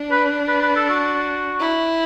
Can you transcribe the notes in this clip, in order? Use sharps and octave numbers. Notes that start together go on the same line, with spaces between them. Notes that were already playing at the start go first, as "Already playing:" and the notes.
Already playing: D4
B4
B4
B4
A4
F#4
E4